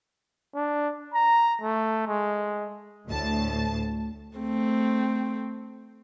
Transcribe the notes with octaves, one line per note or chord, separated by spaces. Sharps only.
D4
A#5
A3
G#3
D2 A2 A5
A3 C4